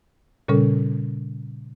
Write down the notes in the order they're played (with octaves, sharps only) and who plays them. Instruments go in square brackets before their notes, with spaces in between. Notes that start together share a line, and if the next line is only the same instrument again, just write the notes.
[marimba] A#2 C#3 G3 C#4 A4